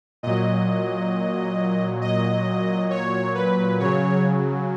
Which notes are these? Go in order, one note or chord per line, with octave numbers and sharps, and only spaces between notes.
A#2 F#3 D#5
D#5
C#5
B4
C#3 F#3 C#5